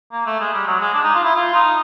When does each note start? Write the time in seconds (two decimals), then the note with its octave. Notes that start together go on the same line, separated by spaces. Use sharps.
0.12 A#3
0.26 A3
0.40 G#3
0.53 G3
0.67 F#3
0.80 G#3
0.94 D4
1.04 D#4
1.15 F4
1.24 E4
1.35 F4
1.55 D#4